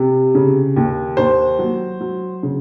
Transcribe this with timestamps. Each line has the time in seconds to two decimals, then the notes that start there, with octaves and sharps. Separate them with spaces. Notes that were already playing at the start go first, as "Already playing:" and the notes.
Already playing: C3
0.35 C#3
0.76 D#2
1.17 D#2 C5
1.59 F#3
2.01 F#3
2.43 C#3